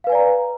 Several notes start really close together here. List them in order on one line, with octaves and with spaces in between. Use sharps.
F5 B4 G#5 D5 A#5